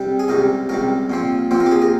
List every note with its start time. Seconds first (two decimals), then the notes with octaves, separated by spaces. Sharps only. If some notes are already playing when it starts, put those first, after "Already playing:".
Already playing: C3 G3
0.19 G#4
0.28 C#2 C3 G3 A#4
0.69 C#2 C3 G3 A#4
1.10 A#2 F3 C4
1.51 A#2 F3 C4 C5
1.60 A#4
1.66 G4
1.71 G#4
1.82 A#4